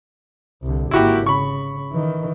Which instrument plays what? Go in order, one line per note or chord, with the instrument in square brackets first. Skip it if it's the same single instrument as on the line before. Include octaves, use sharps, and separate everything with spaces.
[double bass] C2 D3
[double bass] G#1 A#3 [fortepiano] E4 F#4 G4
[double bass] C#3 [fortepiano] B5 C#6
[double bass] D#3 E3